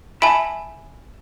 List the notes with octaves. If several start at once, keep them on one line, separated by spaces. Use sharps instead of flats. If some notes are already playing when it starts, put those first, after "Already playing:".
E5 G#5 A5 B5 D7